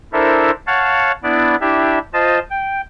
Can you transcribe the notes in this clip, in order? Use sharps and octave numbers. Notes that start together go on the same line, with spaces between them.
D4 E4 A4 A#4 C5 E5
C#5 F5 F#5 A5
B3 D4 E4 D5
D4 E4 G4 E5
F4 C5 D#5 A5
G5